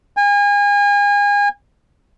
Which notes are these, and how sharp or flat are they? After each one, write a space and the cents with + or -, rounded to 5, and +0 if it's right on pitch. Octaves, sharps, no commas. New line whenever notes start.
G#5 -35